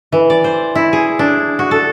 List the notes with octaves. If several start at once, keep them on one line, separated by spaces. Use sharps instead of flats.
E3
D5
C5
E4
G#4
D4
F#4
A4